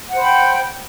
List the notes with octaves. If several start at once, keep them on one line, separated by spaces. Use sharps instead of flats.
C5 F#5 G5 B5